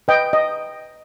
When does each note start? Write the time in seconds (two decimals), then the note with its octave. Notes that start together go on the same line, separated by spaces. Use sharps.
0.08 B4 D#5 G5
0.33 D#5